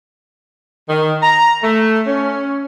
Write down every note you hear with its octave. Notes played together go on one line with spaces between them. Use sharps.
D#3
A#5
A3
C#4